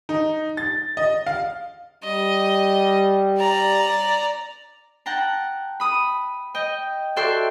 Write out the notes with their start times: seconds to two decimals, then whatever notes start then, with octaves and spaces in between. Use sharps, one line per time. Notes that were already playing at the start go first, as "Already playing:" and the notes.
0.09 D#4
0.57 A6
0.97 D#5
1.26 F5
2.04 G3 D#5
3.38 D5 A#5
5.06 F#5 G5 A5 A#5
5.80 B5 D#6
6.55 D#5 G5
7.16 F#4 A4 D5 E5 G5 C6